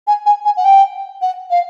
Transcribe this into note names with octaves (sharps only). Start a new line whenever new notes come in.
G#5
G#5
G#5
F#5
G5
F#5
F5